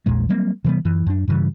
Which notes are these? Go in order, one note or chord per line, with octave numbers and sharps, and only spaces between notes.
A#1 E2 A#2 G#3
F#3 G3 A#3 C4
C3 E3 G3 B3
F#2 E3
F#2 D4
G2 C#3 E3 G3